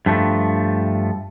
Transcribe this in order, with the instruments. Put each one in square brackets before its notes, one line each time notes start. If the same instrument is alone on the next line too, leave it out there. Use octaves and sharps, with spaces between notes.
[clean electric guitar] G2 F3 A3